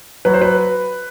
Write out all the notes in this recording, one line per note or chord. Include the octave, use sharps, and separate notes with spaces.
F#3 B4
C5
B4